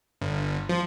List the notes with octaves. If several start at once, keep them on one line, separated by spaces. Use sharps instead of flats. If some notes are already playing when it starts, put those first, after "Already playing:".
G1
F3